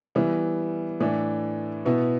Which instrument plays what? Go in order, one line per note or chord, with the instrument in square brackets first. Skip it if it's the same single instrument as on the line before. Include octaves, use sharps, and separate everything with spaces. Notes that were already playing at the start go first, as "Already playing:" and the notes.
[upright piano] E3 G3 B3 E4
A2 E3 A3 D4
B2 B3 E4